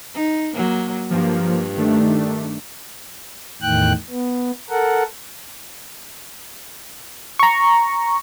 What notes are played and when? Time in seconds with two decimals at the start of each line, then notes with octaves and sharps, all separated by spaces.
0.14 D#4
0.54 F#3 A#3
1.10 G2 F3 A#3
1.77 D#3 A3 D4
3.62 E2 A2 D#3 G5 F#6
4.10 B3
4.70 A4 A#4 F#5
7.39 A#5 C#6